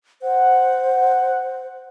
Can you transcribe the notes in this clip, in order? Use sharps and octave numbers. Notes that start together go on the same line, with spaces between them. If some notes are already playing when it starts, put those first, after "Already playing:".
C5 F#5